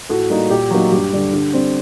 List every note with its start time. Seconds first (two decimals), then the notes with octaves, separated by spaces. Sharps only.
0.09 A2 F#4 A4
0.30 G3 A#3 D#4
0.50 A#2 G4
0.71 F#3 A#3 D#4 F#4
0.92 G2 G4
1.13 D3 G3
1.33 D3
1.53 G3 C4